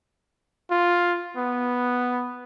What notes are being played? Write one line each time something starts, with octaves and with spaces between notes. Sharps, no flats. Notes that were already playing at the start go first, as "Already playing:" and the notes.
F4
B3